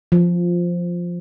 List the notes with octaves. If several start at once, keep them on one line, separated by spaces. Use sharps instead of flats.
F3